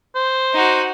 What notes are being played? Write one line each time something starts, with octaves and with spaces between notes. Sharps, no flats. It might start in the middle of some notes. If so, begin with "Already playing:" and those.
C5
D#4 F#4